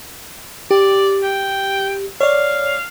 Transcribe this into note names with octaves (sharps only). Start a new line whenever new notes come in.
G4 D5
G5
C#5 D5 F5